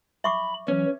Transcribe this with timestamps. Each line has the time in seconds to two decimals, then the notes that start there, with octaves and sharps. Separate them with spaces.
0.24 E5 B5 C#6 D6
0.68 E3 F#3 C#4